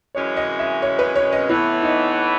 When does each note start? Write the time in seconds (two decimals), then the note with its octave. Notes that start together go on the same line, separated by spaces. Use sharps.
0.15 F#2 E3 G#3 C#4 C#5
0.37 D#5
0.59 E5
0.82 C#5
0.99 B4
1.15 C#5
1.32 D#5
1.49 A2 E3 B3 E4
1.82 D#4